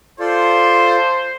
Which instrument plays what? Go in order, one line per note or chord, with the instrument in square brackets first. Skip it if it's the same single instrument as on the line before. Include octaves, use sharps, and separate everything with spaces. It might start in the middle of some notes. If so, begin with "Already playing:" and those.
[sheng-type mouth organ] F4 A4 D5 [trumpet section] C5